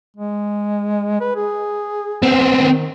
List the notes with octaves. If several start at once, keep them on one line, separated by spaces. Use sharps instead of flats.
G#3
B4
G#4
B3 C4
D#3